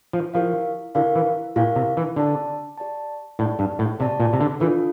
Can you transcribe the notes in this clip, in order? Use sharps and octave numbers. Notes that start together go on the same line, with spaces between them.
F3
F3 E4 G4 A#4 F5
D3 E4 G4 A#4 F5
E3
A#2 E4 G4 A#4 F5
C3
E3
D3 G4 D5 A5
G4 D5 A5
A2 G4 D5 A5
G2
A2
C3 G4 D5 A5
A#2
C3
D3
E3 D4 F4 A4